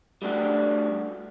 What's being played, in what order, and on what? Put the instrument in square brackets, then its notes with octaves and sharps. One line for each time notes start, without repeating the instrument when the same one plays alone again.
[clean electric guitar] G3 A3 D4 F#4